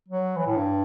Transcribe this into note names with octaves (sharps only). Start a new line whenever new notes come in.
F#3
E3
A2
G2